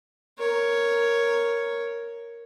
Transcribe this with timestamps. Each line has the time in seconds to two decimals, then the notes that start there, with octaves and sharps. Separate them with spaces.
0.38 A#4 C#5